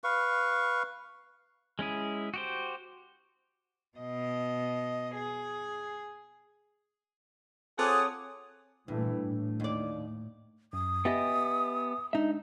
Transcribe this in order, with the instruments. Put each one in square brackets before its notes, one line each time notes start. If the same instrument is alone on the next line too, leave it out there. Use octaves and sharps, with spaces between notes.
[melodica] B4 F5 C#6
[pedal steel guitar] G#3 C#4 E4 G#4
F#4 G4 C5
[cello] B2 D#5
G#4
[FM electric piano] C4 A4 [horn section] F4 G#4 F#5 [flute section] C#5 D6 D#6
[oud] G2 [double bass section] A#2 E3 A3
[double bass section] A2
[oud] D#2 D5
[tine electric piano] F#2 [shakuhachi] D#6
[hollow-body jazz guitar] B3 G4 D#5 [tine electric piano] E5 G#5 A6
[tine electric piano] G#3 D4 [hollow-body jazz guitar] D#4 E5